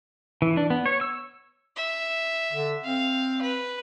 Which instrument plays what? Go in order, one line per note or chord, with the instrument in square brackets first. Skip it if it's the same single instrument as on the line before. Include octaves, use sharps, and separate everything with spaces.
[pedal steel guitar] E3
D4
B3
C#5
E6
[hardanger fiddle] E5
[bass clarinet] D3
[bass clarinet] C4 [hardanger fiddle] F5
[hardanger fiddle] B4